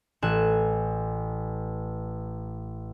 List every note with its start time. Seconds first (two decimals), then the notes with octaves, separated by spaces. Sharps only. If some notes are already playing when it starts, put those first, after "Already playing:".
0.22 A1 G#5 F#6 E7